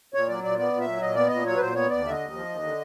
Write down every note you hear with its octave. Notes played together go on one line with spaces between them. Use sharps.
A#2 C#5
F#3 D5
A#2 D5
B3 D5
A#2
E5
F#3
A#2 D#5
B3 D5
A#2 D#5
F#3 C#5
B4
A#2 C5
B3 C#5
D#2 D5
D3 E5
D#5
D#2
F3
D#2
D3